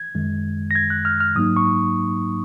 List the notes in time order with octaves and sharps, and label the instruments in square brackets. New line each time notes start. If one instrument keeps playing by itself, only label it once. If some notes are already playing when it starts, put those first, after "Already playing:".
Already playing: [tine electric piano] G#6
F#2 D#3 G#3
A#6
G#6
F#6
F6
F6
G#2 F#3 A#3 D#4 D#6
C#6